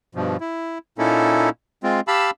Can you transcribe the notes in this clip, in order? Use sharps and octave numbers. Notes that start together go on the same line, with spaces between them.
G2 B2 F3
E4
A#2 A#3 C#4 D#4 E4 A4
G#3 C4 F4
G4 F5 A5 B5 E6